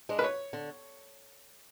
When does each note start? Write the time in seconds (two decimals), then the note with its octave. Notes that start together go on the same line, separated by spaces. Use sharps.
0.09 G#3 D4
0.19 B4
0.24 C#5
0.53 D3